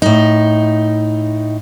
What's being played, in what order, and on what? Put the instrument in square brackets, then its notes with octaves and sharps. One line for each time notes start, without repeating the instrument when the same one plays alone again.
[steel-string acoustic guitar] A2 D#4